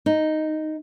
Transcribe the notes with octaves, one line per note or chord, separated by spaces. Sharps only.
D#4